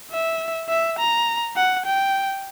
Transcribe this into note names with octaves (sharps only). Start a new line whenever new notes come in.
E5
E5
A#5
F#5
G5